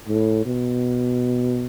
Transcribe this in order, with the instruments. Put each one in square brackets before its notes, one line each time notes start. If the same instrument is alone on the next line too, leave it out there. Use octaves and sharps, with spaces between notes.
[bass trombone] A2
B2